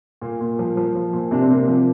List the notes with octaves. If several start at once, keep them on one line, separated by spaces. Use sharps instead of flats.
A#2 A#3
A#2
F3
F3
F3
A#2
C3 D4
C4
C3 A#3
F3 C4